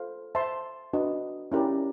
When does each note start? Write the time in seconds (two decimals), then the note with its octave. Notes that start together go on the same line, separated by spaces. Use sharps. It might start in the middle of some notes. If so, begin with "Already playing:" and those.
Already playing: F4 A4 C5 F5
0.35 C5 E5 A5 C6
0.93 D4 F#4 B4 D#5
1.52 C#4 E4 G4 A#4 D5